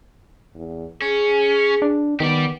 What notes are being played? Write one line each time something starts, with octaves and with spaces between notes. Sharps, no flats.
E2
C#4 G#4
D4
D#3 B3 G4 D5